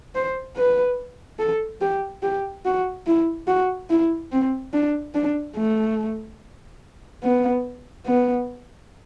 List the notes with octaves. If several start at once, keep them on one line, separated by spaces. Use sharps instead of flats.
C5
B4
A4
G4
G4
F#4
E4
F#4
E4
C4
D4
D4
A3
B3
B3